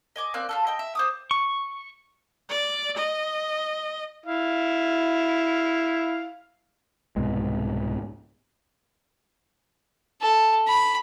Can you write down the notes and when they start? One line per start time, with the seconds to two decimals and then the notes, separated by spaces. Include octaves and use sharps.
0.16 D#5 G#5 D6
0.34 A#3 C4 D5 F#6
0.49 F4 F#4 A4
0.67 D#5 G5
0.79 E5
0.95 C5 D6 D#6
1.31 C#6
2.50 D5
2.97 D#5
4.26 E4 F5
7.16 C2 G#2 B2 G#3
10.21 A4
10.68 B5